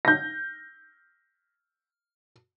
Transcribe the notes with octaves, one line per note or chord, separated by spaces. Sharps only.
G6 A#6